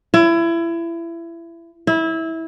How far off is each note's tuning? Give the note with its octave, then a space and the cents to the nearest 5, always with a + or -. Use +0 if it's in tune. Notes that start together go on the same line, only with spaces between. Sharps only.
E4 +25
E4 -20